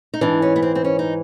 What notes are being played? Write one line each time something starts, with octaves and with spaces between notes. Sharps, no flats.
D#4
G#2 E3 D4
C#4
B3
C4
C4
C#4
D#4